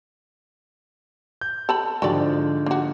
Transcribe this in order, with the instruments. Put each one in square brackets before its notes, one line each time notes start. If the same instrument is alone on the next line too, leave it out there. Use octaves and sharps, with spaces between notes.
[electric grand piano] G6
[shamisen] A4 A5 B5
[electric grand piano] G#2 D3 F3 [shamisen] F#4 G4 D5
[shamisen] A#3 F#4